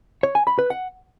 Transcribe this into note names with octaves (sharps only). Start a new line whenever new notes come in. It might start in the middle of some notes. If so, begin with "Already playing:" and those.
C#5
G#5
B5
B4
F#5